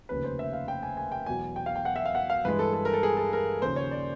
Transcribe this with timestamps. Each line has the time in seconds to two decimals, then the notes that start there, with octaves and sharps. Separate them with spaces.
0.09 F1 D#2 C#3 F3 B4
0.24 C5
0.39 E5
0.53 F5
0.68 G5
0.83 G#5
0.97 G#5
1.12 G5
1.26 E2 B2 F#3 G#5
1.56 G5
1.66 F5
1.76 G5
1.85 F#5
1.96 E5
2.06 F5
2.15 F#5
2.30 F5
2.45 G2 E3 G#3 B4
2.59 A4
2.74 A4
2.85 A#4
2.93 A4
3.03 G#4
3.17 A4
3.33 A#4
3.62 D#2 C#3 F3 A#3 C5
3.76 C#5
3.91 D5